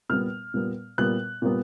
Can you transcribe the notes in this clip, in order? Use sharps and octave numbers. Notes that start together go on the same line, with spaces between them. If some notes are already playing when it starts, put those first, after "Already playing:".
A#2 G3 B3 F6
A#2 G3 B3
A#2 G3 B3 F#6
A#2 G3 B3